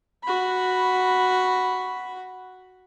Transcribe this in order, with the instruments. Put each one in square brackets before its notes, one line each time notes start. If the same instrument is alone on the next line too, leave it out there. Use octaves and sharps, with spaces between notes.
[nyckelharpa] F#4 B5